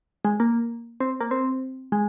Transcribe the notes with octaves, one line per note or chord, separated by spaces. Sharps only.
G#3
A#3
C4
A#3
C4
G#3